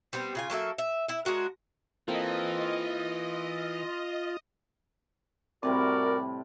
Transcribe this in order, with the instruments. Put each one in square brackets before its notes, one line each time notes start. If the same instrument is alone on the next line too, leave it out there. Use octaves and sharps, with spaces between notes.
[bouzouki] G3 B3 C4
C#3 F4 G#5
F#3 A#3 A4 E5
E5
E4 E5
G#3 D4 F#4 A#4
[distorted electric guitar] E3 [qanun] A#3 C4 A4 [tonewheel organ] F4 [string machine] D#5
[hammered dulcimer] A2 C3 G3 [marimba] C4 [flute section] F#4 A#4 [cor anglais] D5